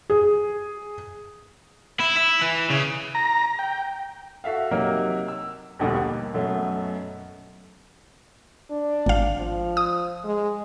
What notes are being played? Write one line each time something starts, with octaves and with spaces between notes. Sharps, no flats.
G#4
E4
E4
E3
C#3
A#5
G5
F#4 A4 E5 F5
C3 F#3 A#3 D#4 A#4
E6
A#1 D#2 B2 D3 G3 A3
A#3
F#2 B2 F#3 A3
D4
G#1 F5
F3
D#6
G#3